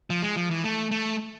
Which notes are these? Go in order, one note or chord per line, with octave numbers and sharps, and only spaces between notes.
F3
G#3
F3
E3
A3
A3